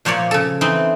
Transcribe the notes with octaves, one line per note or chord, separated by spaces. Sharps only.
A#2 F3 A#3 C#5 D5
C#3 A4
E3 C4 D#4